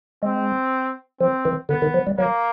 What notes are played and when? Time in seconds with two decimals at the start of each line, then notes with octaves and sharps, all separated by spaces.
0.23 G#3 C4
1.21 F3 C4
1.45 E3
1.69 D3 B3
1.82 D#3
1.94 F3
2.07 G3
2.18 F#3 A#3